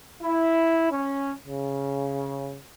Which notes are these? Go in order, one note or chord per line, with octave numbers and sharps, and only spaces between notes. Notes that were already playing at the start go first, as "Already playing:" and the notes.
E4
C#4
C#3